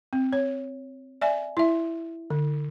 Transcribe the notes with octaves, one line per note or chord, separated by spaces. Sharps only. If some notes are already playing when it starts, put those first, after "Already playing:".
C4
C#5
D5 E5 G#5
E4 E5
D3